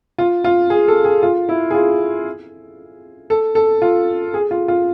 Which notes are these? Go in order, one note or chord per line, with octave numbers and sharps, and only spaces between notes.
F4
F4
G#4
A4
G#4
F4
E4
G#4
F4
A4
A4
F4
G#4
F4
F4